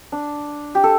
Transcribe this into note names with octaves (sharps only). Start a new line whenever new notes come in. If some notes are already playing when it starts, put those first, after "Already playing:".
D4
G4
A4